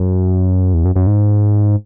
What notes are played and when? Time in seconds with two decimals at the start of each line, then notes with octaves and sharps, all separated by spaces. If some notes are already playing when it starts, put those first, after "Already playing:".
Already playing: F#2
0.74 E2
0.85 F#2
0.96 F#2
1.07 G#2